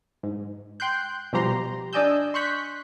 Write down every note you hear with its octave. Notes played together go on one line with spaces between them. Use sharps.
G#2
G5 C6 F#6 G6
B2 F3 G3 G4 A#5 C6
D4 D5 D#5 G#5 E6 G6
C6 C#6 F#6 G6 B6